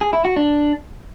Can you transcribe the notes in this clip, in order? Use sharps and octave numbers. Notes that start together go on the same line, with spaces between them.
G#4
E4
F#4
D4